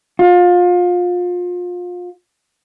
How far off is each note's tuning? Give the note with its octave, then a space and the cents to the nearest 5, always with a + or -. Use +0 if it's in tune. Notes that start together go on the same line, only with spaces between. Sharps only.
F4 +30